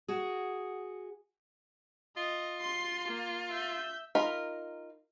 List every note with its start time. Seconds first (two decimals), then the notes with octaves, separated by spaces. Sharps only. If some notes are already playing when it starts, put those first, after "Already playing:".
0.08 F#4 G#4
2.17 F4 D#5
2.60 C6 C7
3.08 A#3
3.50 E5 G6
4.15 D#4 F4 A#4 B5